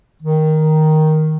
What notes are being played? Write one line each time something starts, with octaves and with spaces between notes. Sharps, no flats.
D#3